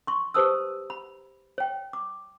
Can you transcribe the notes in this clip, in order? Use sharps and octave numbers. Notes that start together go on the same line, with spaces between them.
C6 C#6
G4 B4 C5 A5 D#6 E6
B5
C#5 G5
D6